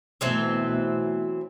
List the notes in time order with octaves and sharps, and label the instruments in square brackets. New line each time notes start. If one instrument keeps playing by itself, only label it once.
[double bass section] B2 A3 [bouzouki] E3 F#3 C4